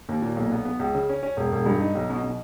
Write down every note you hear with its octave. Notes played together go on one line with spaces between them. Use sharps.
D#2
A#2
B1
B3
B3
C#2
C#3
C#4
C#4
E1
E1
G2
D#4
B1
B2
B2